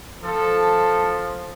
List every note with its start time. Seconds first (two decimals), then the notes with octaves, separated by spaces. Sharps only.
0.23 F3 A4